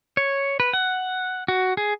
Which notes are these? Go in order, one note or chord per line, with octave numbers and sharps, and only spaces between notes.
C#5
B4
F#5
F#4
G#4